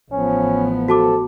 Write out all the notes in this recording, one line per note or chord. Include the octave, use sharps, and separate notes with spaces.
A1 F3 B3 C#4
F#4 A4 A5 D6